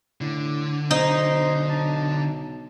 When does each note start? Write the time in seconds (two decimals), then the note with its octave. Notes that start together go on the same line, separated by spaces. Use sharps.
0.21 A2 D3
0.91 B1 D#4 C5
1.69 A5